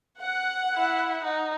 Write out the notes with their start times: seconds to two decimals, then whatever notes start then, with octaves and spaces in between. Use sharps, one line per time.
0.22 F#5
0.75 E4
1.24 D#4